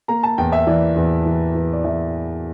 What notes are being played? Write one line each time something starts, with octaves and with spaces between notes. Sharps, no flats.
A#3 A#5
A5
E2 G5
E5
E3 D5
E2
E3
E3
D5
E3 E5